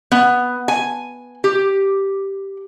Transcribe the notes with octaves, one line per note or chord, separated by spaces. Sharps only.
B3
G#5
G4